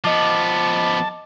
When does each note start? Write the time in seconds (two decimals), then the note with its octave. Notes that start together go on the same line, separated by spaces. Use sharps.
0.04 F3 B3 D#5 A5 D6